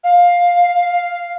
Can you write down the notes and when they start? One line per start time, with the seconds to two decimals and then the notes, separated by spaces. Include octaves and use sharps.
0.04 F5